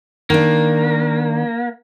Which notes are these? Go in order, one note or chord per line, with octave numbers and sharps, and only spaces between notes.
D#3 A#3 D4